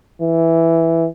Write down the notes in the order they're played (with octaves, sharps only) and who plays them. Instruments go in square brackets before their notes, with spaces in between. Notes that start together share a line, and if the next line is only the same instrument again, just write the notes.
[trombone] E3